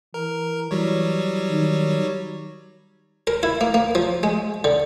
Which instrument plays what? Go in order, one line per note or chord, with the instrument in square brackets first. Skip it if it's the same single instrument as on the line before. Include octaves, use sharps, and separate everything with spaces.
[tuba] E3 [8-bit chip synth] A#4
[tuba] E3 [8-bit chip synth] F#3 G3 C#5
[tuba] D#3
[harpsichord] A#4
E4
A#3
A#3
F3
G#3
D3